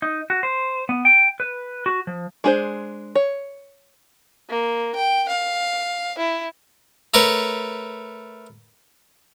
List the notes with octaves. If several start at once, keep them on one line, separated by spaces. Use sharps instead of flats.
D#4
F#4
C5
B3
G5
B4
F#4
F3
G#3 D4 G#4 A4 C5
C#5
A#3
G5
F5
E4
A3 A#4 B4 C#5